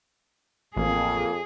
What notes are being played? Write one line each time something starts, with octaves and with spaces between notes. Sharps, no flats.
A1 F2 A#3 G#4